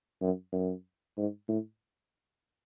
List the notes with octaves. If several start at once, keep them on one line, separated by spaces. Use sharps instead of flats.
F#2
F#2
G#2
A2